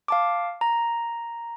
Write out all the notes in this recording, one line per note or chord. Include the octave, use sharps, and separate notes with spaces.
F5 A5 D6
A#5